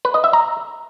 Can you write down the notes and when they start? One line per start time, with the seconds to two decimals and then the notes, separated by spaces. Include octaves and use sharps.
0.05 B4
0.14 D#5
0.24 E5
0.33 A#5